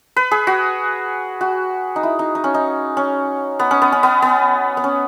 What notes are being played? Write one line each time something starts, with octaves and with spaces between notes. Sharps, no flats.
B4
G#4
F#4
F#4
D#4
E4
D#4
D#4
C#4
D#4
C#4
B3
C#4
B3
C#4
B3
B3
B3
C#4